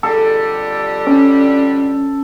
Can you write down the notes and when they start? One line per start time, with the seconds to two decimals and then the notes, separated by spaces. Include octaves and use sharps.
0.03 F2 D3 G3 A4
1.07 C#4